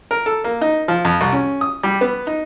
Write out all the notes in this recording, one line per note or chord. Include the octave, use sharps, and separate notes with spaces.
A#4
A4
A#3
D#4
F3
F2
C2
C#4
D#6
G3
B3
D#4